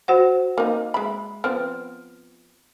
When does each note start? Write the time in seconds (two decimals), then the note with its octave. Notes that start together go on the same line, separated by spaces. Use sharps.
0.08 F#4 C5 F#5
0.58 A#3 D#4
0.94 G#3 E5 B5
1.44 F3 B3 C4 F6